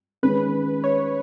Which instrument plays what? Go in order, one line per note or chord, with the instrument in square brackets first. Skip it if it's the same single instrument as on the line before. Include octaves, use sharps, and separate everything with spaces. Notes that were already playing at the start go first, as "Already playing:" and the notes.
[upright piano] D#3 G#3 C#4 [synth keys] B4
[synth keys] C#5